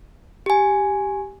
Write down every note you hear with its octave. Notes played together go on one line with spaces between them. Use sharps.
G4 G#5